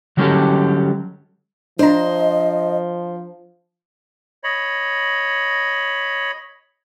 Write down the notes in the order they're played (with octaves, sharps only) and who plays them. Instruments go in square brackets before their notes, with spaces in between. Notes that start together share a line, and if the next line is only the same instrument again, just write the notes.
[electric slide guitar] D3 F#3 G3 C#4 G4 A4
[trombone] F3 [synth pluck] D4 A#5 [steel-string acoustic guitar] C5 [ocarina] D#5
[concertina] C#5 D#5 B5